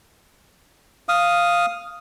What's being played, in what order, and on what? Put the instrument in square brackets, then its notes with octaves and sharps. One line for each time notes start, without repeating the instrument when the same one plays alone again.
[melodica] F5 D#6